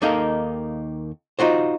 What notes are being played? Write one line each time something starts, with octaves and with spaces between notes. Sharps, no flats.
D#2 D#3 A#3 D#4 A4 F5
D#4 F4 F#4 C5